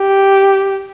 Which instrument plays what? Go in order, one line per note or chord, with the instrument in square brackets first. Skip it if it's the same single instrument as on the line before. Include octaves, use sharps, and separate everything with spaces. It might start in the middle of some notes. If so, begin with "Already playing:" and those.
Already playing: [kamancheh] G4